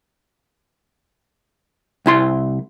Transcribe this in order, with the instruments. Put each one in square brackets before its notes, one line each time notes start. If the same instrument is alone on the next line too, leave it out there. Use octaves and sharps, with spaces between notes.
[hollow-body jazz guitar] C2 E4 C6